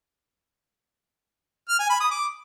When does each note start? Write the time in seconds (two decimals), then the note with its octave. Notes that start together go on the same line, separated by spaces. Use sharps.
1.69 F6
1.79 G#5
1.90 B5
2.00 D#6
2.11 D6